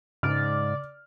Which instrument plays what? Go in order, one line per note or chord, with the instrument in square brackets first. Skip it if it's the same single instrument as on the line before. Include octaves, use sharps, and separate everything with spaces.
[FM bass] G#2 [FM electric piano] C#3 [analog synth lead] D5 [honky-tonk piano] F6